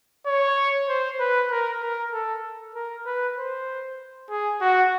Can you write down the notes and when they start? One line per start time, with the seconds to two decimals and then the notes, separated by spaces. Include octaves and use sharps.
0.26 C#5
0.89 C5
1.20 B4
1.51 A#4
1.82 A#4
2.13 A4
2.75 A#4
3.06 B4
3.37 C5
4.30 G#4
4.61 F#4